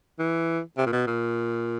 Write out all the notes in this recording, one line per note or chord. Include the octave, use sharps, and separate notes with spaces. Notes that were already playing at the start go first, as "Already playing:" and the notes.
E3
C3
A#2
B2
A#2